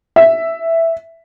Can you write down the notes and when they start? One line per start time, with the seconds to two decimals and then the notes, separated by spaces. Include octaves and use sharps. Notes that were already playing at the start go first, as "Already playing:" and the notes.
0.16 E5